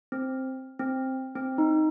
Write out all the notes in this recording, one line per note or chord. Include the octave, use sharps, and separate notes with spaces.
C4
C4
C4
D#4